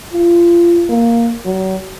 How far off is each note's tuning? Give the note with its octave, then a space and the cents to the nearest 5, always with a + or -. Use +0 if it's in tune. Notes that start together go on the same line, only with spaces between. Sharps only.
F4 -25
A#3 +0
F#3 +35